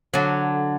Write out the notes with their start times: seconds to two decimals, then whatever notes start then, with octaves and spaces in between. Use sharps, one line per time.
0.14 D3 F#3